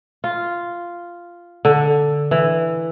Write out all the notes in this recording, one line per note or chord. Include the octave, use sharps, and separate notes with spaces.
F4
D3
E3